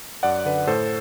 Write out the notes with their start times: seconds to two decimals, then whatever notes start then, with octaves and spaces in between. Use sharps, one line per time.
0.23 F#2 D5 F#5
0.45 D3 B4 D5
0.68 A2 A4 C5